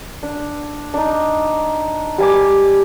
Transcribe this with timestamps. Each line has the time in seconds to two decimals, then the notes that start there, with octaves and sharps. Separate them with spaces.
0.23 D4
0.94 D4 D#4
2.18 G3 G#5 D6